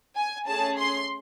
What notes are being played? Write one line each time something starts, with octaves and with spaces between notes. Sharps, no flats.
G#5
A3 C#4 G#4 A5
C6